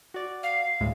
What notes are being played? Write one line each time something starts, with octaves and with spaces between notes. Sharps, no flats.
F#4 D5
F5
D2 A2 G#3